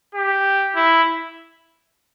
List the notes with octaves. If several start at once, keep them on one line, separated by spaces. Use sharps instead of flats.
G4
E4